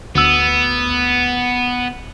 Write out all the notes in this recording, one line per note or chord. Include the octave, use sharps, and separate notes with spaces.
D2 B3 E6